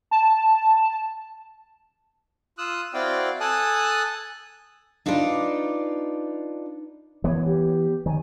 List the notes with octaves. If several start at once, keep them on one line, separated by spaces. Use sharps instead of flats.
A5
F4 D#6 E6 F#6
C4 E4 F#4 D5 F5 G5
A4 G#5 A5 D#6 F#6
D4 D#4 F4 B4 D5
E3 B3 C#5
G4
D#3 G#5